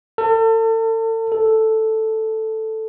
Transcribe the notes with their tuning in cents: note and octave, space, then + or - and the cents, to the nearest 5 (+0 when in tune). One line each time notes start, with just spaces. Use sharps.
A4 +35
A4 +0